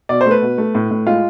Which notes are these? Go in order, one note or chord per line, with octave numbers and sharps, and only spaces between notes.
B2 D5
C5
A3
B4
B2
A3
A2
A2
G#3 F4